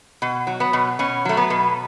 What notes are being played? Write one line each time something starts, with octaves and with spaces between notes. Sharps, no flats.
B2
F#3
B3
B2
B2 C#4
F#3 A3
B3
B2